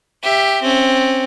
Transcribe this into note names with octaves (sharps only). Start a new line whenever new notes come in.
G4 E5
C4 C#4